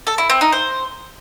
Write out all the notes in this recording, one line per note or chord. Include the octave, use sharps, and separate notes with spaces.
A4
E4
C4
D#4
C5